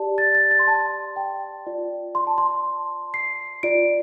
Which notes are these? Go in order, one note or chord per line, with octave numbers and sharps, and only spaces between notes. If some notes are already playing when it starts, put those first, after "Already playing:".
Already playing: G4 D5 A5
A6
A6
A6
C6
A5
G5
F4 D5
C6
A5
C6
C7
F4 D5 D7